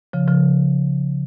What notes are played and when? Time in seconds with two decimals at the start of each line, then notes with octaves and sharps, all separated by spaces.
0.13 C#3 F3
0.28 C#3 F3